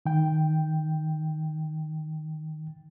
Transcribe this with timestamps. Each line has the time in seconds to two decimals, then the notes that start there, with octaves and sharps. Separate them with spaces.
0.06 D#3 G5